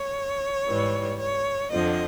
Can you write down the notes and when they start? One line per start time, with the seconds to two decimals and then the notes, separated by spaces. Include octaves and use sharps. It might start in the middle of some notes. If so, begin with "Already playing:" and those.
Already playing: C#5
0.67 G#2 E3 G3
1.18 C#5
1.71 F2 D3 F3 D#5